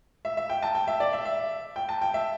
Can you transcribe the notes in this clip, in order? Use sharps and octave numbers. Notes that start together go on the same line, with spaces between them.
E5
E5
G5
A5
G5
E5
D5
E5
E5
G5
A5
G5
E5